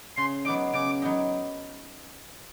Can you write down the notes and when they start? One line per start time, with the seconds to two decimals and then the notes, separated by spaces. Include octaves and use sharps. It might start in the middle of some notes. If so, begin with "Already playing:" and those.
0.17 C#3 C6
0.45 F#3 B3 D#4 D6
0.73 C#3 D6
1.02 F#3 B3 D#4